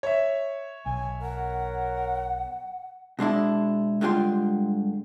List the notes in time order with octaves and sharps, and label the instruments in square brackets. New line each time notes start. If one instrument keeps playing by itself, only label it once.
[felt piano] C#5 E5
[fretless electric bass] B1 [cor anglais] G#5
[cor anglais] A#4 [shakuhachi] F#5
[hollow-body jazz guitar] B2 G#3 D4 E4
G2 D3 G#3 F4 G5 C6